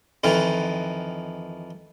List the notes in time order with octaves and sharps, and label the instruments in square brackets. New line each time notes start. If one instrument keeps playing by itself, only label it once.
[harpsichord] F2 D#3 E3